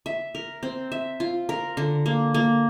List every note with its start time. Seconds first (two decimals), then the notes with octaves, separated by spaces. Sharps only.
0.06 E5
0.35 A#4
0.63 C4
0.92 E5
1.20 F4
1.49 A#4
1.77 D3
2.06 A#3
2.34 A#3